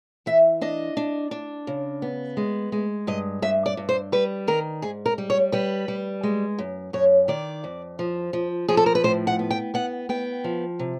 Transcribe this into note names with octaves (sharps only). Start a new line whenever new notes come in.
E3 E5
D4 D#5
D4
D4
C#3
B3
G#3
G#3
G2 D#5
G2 E5
D5
G2
C5
G3 B4
D#3 A#4
G#2 G#4
A#4
G3
C#5
G3 B4
G3
G#3
F#2
F#2 C#5
D#3 D5
F2
F3
F3
F3 G#4
A4
A#4
B4
A2 C5
F#5
B3
G5
B3 F#5
B3 G5
F3
C3